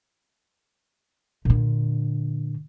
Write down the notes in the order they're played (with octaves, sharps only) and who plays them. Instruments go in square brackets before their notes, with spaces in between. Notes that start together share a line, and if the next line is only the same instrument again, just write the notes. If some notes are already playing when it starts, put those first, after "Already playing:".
[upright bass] A#2 D3